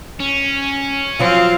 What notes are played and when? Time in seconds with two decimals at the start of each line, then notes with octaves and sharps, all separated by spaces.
0.20 C#4
1.19 F3 F#3 C4 F4 F5